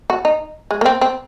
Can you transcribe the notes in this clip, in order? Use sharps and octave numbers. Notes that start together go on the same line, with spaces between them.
F#4
D#4
G#3
A#3
C4
C4